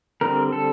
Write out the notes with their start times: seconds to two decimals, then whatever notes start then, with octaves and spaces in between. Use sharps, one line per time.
0.21 D3 G3 C4 A#4
0.52 A4